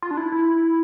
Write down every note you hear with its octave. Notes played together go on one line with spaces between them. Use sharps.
F4
D4
E4
E4